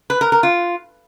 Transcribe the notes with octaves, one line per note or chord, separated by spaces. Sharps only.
B4
A#4
A#4
F4